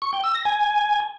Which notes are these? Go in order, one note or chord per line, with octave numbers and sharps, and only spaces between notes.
C#6
G5
E6
A#6
G#5